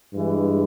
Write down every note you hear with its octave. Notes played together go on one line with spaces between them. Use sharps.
G2 E3 G#3